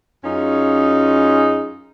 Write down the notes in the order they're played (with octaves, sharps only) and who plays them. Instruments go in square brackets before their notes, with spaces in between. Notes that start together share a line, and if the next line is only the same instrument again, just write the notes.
[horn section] F#2 C#4 D#4 F4 G#4